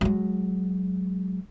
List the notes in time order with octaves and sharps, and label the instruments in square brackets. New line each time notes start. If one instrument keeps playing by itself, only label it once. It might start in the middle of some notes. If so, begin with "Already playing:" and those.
[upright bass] F#3 G#3